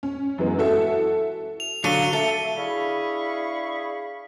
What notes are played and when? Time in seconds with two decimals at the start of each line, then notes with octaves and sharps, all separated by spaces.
0.03 C#4
0.38 F#2 E3 G#3 B3
0.58 E4 F#4 A4 E5
1.60 F7
1.84 D3 F#3 F5 C#7 D#7 G7
2.13 A4 E5
2.58 D4 E4 G#4 F5 B5 C#6